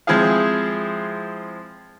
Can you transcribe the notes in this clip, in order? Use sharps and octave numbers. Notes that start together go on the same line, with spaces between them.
F3 G#3 C4 E4 G#4 F5